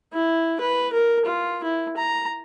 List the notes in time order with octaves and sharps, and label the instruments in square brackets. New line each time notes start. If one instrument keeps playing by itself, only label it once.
[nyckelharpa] E4
B4
A#4
F4
E4
A#5